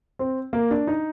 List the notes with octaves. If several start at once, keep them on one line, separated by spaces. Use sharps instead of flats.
C4
A#3
D4
D#4